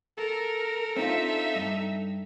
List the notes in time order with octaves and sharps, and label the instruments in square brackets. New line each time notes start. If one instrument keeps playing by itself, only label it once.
[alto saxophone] A4 [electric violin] A#4
[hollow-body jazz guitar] C4 D4 F4 [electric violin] D#4 E5
[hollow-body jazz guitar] G2